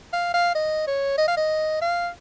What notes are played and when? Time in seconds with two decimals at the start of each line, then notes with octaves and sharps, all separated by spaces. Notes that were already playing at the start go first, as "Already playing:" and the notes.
0.13 F5
0.34 F5
0.55 D#5
0.87 C#5
1.18 D#5
1.28 F5
1.37 D#5
1.82 F5